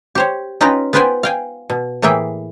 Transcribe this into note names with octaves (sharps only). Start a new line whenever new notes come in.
G4 C5 C#5
C#4 D#4 F4 B4 G5 A#5
B3 F4 B4 C5 G5 G#5
F5 G5 G#5
B2
A2 E3 A#3 G#4 E5 G5